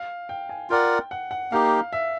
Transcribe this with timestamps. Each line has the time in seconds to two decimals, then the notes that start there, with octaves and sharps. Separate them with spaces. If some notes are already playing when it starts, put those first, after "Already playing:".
Already playing: F5
0.29 G5
0.49 G#5
0.70 F4 A#4 D5 F#5 G5
1.11 F#5
1.31 F#5
1.52 A#3 D#4 G4 F5
1.93 E5